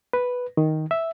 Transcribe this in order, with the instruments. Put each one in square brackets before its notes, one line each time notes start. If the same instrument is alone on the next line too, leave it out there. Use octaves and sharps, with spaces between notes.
[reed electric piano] B4
D#3
E5